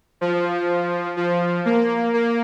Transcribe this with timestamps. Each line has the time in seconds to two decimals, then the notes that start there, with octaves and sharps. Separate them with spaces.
0.21 F3
1.17 F3
1.65 A#3
2.14 A#3